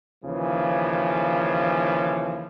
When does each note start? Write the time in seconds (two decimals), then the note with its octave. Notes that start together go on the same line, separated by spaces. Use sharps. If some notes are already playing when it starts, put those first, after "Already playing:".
0.24 D#2 C#3 E3 F3